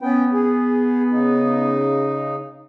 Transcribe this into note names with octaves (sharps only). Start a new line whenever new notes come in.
B3 C#4 G5
G#4
C#3 D#4